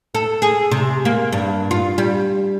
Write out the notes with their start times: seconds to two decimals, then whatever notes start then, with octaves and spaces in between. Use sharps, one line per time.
0.15 A4
0.42 G#4
0.71 C3
1.05 A#3
1.33 G2
1.71 F4
1.98 G3